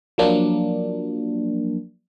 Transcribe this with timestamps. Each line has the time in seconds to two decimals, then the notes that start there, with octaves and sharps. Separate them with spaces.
0.18 F3 F#3 A#3 D4